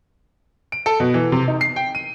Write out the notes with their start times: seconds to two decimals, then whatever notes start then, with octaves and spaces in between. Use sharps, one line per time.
0.72 D7
0.86 A4
1.00 B2
1.14 E3
1.32 C3
1.48 D#4
1.61 C7
1.76 G5
1.95 D#7